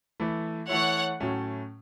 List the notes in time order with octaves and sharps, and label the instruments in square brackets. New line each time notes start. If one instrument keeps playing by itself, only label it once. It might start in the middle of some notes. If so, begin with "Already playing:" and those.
[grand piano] E3 A3 E4
[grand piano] E3 A3 E4 [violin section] C#5 F#5
[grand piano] A2 F#3 A3 C#4